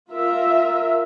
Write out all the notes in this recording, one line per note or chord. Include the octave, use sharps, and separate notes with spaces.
F4 A#4 E5